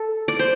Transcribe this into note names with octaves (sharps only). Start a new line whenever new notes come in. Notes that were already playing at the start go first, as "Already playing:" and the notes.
Already playing: A4
D5
C5